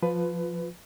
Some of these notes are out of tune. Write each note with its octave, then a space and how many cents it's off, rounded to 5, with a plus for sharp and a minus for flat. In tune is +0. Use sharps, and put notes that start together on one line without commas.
F3 +0 F4 +20 B4 +15